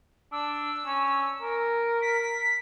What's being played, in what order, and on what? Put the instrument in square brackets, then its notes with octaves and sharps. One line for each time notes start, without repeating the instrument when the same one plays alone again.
[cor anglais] D4 [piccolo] E6
[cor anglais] C#4
A#4
[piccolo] B6